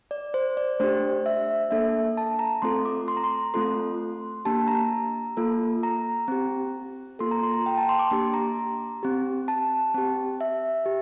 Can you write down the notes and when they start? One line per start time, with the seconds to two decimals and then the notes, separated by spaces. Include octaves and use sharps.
0.11 D5
0.34 C5
0.57 D5
0.80 A3 D4 G4 C5
1.26 E5
1.71 A#3 D4 A4 E5
2.17 A5
2.39 A#5
2.62 A3 C4 F4 A4 C6
2.85 D6
3.08 C6
3.17 A#5
3.24 C6
3.54 A3 C4 F4 A4 C6
4.45 A#3 D4 G4 A5
4.68 A#5
5.37 A#3 F4 A4
5.83 A#5
6.28 C4 G4
7.19 A#3 F4 A4 C6
7.31 A#5
7.43 C6
7.54 A#5
7.66 G5
7.77 A5
7.89 C6
7.99 D6
8.11 A#3 D4 G4 C6
8.34 A#5
9.03 C4 G4
9.48 A5
9.94 C4 G4
10.41 E5
10.86 G4